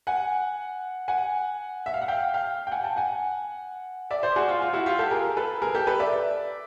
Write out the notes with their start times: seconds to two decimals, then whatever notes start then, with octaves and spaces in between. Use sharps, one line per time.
0.07 F#5 G#5
1.08 F#5 G#5
1.86 E5
1.94 F5
2.02 F#5
2.08 F5 G5
2.34 F5 G5
2.67 G5
2.71 F#5 G#5
2.84 G5 A5
2.96 F#5 G#5
4.10 D5 E5
4.23 C5 D5
4.36 F#4 G#4
4.48 F4
4.62 F4
4.73 E4 F#4
4.86 F4 G4
4.99 G4 A4
5.11 G#4 A#4
5.37 A4 B4
5.62 G#4 A#4
5.75 G4 A4
5.87 A4 B4
6.00 D5 E5